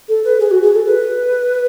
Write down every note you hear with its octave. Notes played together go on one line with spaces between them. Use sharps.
A4
B4
G#4
F#4
G#4
A4
B4